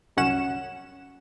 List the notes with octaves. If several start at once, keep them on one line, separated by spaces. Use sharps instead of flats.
G1 C2 F#2 C#4 F#5 E7